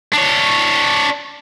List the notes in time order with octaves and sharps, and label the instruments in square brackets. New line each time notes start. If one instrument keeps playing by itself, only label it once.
[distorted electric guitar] D4 C#5